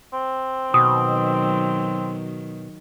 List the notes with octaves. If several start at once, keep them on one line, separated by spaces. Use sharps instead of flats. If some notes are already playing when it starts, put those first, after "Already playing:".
C4
B2 D#3 F#3 D#6